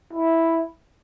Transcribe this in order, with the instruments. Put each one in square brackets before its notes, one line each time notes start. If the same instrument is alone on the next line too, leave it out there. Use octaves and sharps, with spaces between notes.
[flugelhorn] E4